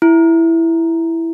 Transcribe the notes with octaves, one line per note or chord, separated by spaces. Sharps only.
E4